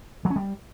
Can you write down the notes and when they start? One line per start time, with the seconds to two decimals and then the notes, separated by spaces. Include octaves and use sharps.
0.25 F#3
0.30 C#4
0.36 G3